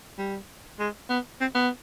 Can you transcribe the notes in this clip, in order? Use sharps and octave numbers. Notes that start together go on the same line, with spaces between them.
G3
G#3
B3
C4
B3